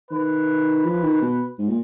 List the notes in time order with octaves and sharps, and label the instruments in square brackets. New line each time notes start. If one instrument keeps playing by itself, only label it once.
[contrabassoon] D#3 [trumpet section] B4
[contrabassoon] F3
D#3
B2
G#2
A#2